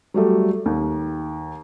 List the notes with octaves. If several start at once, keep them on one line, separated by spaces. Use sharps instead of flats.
F#3 G3 A3
D#2